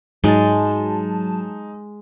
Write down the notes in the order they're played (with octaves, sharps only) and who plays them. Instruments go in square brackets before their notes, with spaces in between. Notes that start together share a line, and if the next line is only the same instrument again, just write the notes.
[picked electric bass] G#2 [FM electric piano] F#3 A5 [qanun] G#3 [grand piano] D#4